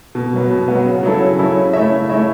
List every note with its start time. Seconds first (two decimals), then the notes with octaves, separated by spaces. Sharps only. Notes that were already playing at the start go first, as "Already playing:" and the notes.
0.15 B2
0.33 F#3 B3
0.50 B2
0.68 F#3 B3
0.86 C#3
1.03 F#3 C#4 E4 A4
1.21 C#3
1.39 F#3 C#4 E4 A4
1.56 C#3
1.73 A3 E4 C#5 E5
1.91 C#3
2.09 A3 E4 C#5 E5